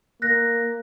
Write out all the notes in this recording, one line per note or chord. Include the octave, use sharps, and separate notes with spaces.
A#3 F#6 A#6